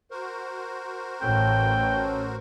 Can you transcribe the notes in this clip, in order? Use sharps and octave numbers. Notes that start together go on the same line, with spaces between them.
F#4 A#4 C5
A1 C#4 A4 G5